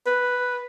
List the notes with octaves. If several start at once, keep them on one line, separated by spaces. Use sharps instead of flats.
B4